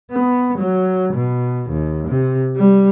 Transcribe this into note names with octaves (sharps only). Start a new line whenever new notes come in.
B3
F#3
B2
D#2
C3
G3